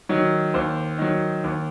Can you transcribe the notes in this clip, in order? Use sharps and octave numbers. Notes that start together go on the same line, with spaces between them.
D#3 F#3
D#2 C5
D#3 F#3
D#2